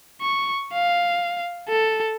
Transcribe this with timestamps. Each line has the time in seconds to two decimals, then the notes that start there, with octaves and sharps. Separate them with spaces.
0.21 C#6
0.73 F5
1.69 A4